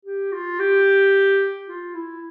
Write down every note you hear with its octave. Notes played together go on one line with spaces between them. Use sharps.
G4
F4
G4
F4
E4